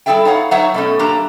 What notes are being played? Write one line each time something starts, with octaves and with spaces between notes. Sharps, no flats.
G3 E4 G#4 A4 E5 G5
D#4 C#5 F5 F#5
F#3 D#4 C5 C#5 E5 F#5
B2 A3 C#4
F#2 A#3 D4 G4 A5 A#5